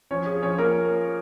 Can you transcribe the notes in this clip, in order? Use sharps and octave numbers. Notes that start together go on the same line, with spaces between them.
F3 C#4 C#5
G#4
F3 C#4 C#5
A#3 A#4